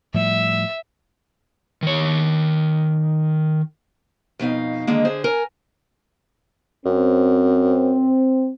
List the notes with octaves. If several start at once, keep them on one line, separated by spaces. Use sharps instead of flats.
A2 F3 G3 E5
D#3 C#5
F2 B2 D#4 F5
D3 D#3 G#3 A#3
D3 G#4 C5
A#4 G#5
F#2 C4